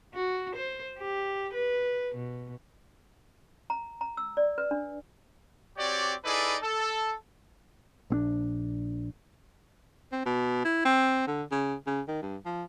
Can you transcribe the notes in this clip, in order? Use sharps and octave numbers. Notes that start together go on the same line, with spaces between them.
F#4
C5
G4
B4
B2
A#5
A#5
E6
D5
B4
D4
C4 F#4 G4 C#5 D5
D#4 E4 G#4 A4 B4 D5
A4
A#1 C4 D4
C4
B2
E4
C4
D3
C#3
C#3
D#3
G2
F3